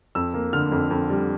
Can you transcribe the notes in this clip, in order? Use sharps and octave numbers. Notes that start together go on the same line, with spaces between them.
F2 E6
A#3
D3 F6
F2
F2
G3